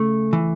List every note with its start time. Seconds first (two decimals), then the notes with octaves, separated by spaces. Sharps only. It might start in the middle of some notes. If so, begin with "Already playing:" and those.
Already playing: C#3 A3
0.33 E3